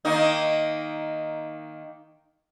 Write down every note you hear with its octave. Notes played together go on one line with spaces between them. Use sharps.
D#3 A#3 D#4